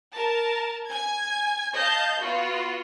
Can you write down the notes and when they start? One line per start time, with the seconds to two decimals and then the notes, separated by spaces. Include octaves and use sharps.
0.14 A#4 A5
0.91 G#5 G#6
1.77 D#5 F5 A5 G6
2.23 B3 F4 F#4